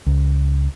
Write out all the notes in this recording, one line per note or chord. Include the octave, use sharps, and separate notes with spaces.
C#2